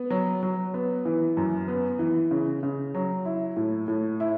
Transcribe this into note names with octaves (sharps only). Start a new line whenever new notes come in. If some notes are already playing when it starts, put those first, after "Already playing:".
Already playing: B3
F#3
F#3
B3
E3
F#2
B3
E3
C#3
C#3
F#3
E4
A2
A2
E4